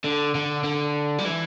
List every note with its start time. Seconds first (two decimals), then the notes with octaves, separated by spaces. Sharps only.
0.04 D3
0.35 D3
0.64 D3
1.18 G3
1.25 E3